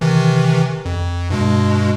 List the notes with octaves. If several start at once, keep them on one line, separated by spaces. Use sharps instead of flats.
C3 D#3 E3
F2
G2 B2 G#3